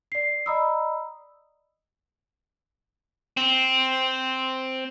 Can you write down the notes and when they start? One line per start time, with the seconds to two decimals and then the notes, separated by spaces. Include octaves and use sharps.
0.12 D5 C7
0.46 D5 D#5 A#5 B5 D#6 E6
3.37 C4